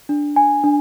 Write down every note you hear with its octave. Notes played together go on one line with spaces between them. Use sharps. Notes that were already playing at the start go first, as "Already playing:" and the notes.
D4
G#5
D4